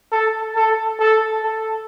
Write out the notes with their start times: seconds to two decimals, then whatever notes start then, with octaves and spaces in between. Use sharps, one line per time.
0.12 A4
0.56 A4
1.00 A4
1.43 A4